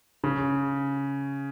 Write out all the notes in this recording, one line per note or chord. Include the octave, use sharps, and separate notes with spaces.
C#3